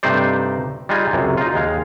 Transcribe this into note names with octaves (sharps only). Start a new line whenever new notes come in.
G2 C3 A3 D#4 C5 D5
G3 G#3 D#4 F4 G#4
C#2 F#2 C3
D#4 F4
D#2 G#3 F5